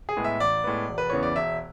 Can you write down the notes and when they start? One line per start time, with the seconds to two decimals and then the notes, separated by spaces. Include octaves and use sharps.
0.09 G#4
0.17 A2 G#3 B3
0.24 E5
0.40 A1 D5
0.64 A2 G#3 B3
0.89 E1
0.98 B4
1.10 E2 C#3 E3 B3 C#5
1.23 D5
1.36 E1 E5